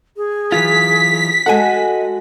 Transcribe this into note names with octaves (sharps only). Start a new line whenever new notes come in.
G#4
E3 F#3 F4 B6
G#3 F#4 A4 D#5 F#5 G#5